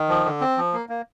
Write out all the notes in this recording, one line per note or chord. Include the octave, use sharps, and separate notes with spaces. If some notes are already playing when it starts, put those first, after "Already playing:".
Already playing: D#3
F3
D3
C4
F3
A#3
A#3